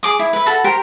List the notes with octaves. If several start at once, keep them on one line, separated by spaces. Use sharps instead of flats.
G#4 D6 D#6
E4
B4 E5
F#4 A4 F#5 B5
G4 A#4 C5